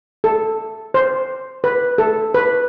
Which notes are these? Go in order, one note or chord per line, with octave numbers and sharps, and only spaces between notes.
A4
C5
B4
A4
B4